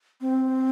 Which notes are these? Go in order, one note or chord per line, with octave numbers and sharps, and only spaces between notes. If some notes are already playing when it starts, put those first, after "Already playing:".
C4